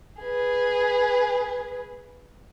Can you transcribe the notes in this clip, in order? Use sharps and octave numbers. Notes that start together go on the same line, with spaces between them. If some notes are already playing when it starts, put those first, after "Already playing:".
G#4 B4